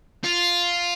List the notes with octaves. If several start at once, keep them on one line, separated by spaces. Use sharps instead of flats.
F4